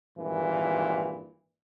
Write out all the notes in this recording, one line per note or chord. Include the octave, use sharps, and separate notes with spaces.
G#1 G2 A#2 E3